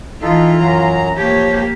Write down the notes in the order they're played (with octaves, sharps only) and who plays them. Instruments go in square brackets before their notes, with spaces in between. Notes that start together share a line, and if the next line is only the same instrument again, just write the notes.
[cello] E3 F4 [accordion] D#4 A4
[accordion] F#2 F#3 A#5
[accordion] F3 C#5 [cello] A#3 G4